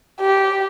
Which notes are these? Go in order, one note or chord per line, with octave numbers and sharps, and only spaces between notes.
G4